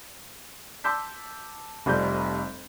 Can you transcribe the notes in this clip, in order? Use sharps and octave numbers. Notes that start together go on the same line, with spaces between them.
A5 C6 D6 E6 G6 B6
F1 F2 G3 G6